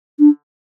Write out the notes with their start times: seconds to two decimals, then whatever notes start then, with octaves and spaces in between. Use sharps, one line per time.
0.19 D4